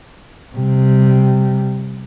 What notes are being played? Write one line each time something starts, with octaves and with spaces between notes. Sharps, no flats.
C3 G3